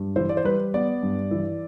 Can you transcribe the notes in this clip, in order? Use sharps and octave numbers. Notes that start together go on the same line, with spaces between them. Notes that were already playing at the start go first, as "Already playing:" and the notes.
Already playing: G2
E3 C5
D5
C5
G3 B4
B3 D5
G2
E3